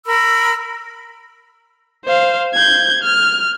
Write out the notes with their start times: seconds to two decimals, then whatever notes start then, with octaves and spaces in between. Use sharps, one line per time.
0.07 A#4 B5 E6
2.06 C5 F5
2.54 G6 G#6
3.03 F6